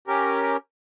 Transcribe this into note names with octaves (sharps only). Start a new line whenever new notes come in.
C#4 G4 A#4